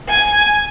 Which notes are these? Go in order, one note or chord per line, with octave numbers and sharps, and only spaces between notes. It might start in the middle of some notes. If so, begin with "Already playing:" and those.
G#5